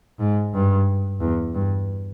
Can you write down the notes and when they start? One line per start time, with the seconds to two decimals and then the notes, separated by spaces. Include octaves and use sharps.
0.19 G#2
0.53 G2
1.20 E2
1.54 G2